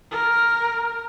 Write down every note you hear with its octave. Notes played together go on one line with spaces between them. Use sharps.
A#4